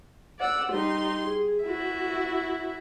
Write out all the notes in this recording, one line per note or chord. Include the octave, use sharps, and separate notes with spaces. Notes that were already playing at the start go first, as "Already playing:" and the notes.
D5 F#5 E6
G3 D#4 C6
G#4
E4 F#4 E5